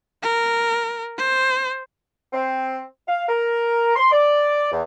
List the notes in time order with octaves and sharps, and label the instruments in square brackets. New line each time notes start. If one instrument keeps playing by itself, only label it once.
[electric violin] A#4
C5
[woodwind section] C4
F5
A#4
C6
D5
E2